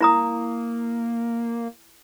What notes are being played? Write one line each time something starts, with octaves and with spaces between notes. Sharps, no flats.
A#3 E4 A#5 D#6